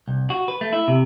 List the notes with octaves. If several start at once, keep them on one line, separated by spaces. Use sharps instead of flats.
C2
F#4
B4
A3
E4
C3